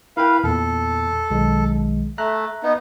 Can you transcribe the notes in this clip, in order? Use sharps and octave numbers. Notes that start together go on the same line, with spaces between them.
E4 A#4 B4 F5 G5
E2 A#2 A4
B1 D#3 G#3
A3 E5 A#5 F#6
B3 D#4